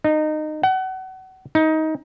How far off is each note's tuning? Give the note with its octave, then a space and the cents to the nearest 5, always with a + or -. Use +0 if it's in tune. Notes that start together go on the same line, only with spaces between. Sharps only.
D#4 -20
F#5 +30
D#4 +20